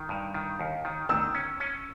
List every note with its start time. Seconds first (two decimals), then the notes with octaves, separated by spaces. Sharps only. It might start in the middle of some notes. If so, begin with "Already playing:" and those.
Already playing: D#3
0.09 G2
0.34 D#3
0.60 D#2
0.85 D#3
1.09 D#3 E6
1.34 C#4
1.60 C#4